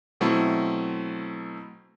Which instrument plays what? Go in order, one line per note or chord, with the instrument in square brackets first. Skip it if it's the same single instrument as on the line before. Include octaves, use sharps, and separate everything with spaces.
[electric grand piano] B2 F#3 A3 C4 E4